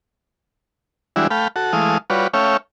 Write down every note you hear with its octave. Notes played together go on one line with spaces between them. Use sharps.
E3 G3 G#3 D4 E4 F#4
A3 F5 G5 B5
F#4 A4
E3 G#3 A3 F5 D#6
G3 F4 F#4 B4 C#5 D5
A3 C#4 C#5 E5 F5 G5